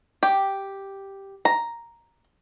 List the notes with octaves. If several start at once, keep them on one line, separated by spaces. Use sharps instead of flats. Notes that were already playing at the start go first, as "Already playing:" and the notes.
G4
A#5